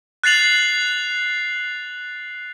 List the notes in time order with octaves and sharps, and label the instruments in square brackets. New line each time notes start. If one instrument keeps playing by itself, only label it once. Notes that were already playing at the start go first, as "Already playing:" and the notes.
[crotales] F#6 A6 C7 F7 F#7